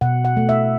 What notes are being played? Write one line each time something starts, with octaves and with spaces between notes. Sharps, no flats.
B2 F#5
F#5
A3
E5